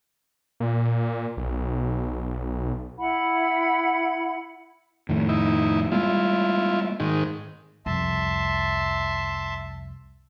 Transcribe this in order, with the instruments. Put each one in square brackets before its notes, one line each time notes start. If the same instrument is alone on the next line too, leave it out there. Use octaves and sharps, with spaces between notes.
[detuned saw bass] A#2
B1
[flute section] E4 F#5 B5
[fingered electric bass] F2 A2 D#3
[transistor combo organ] D#4 E4
[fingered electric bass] G3 G#3 A#3 [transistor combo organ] E4 F4
[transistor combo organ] G#2 D#3
[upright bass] C2 F2 [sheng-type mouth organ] E5 A5 C6